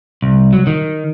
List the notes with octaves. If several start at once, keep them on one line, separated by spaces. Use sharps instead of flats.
C2
F#3
D#3